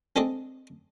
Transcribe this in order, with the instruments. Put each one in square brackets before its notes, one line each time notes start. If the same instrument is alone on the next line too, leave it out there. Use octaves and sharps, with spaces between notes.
[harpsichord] G#3 C4 D4 A4 D5 D#5